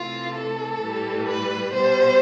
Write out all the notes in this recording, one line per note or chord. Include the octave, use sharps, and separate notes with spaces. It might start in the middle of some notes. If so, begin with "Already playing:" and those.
Already playing: C3 E3 A3 F4
A4
A2 E3 G3
B4
B2 G3 C5